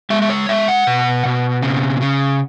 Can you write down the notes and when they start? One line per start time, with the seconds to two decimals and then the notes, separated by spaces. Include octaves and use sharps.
0.10 G#3 E5
0.22 E5
0.30 C#5
0.49 G#3 E5
0.68 F#5
0.87 B2
1.25 B2
1.62 C#3
2.01 C#3